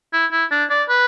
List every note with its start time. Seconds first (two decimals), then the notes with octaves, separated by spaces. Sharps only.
0.13 E4
0.32 E4
0.51 D4
0.70 D5
0.89 B4